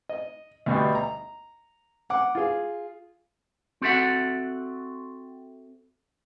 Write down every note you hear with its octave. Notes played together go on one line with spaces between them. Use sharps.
D#5
D2 B2 G3
A#5
F#5 D6
F4 G#4
C4 F#4 A4 E5 F#5